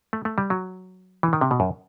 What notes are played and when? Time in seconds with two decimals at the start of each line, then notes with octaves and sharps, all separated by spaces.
0.13 A3
0.25 A3
0.38 G3
0.50 F#3
1.23 E3
1.33 D#3
1.41 C3
1.51 B2
1.60 F#2